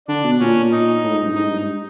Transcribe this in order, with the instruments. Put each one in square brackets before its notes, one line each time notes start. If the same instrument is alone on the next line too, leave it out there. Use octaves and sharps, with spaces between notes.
[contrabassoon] D3 [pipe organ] D4
[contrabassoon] B2
[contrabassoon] A#2 [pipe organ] C#4
[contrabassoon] A#2
[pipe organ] D#4
[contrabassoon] A2
G#2
G2
[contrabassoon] G#2 [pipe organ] D#4
[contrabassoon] G2